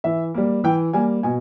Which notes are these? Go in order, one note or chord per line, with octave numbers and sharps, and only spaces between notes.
E3 E5
G3 A#3
E3 G5
G3 A#3 G#5
B2 G#5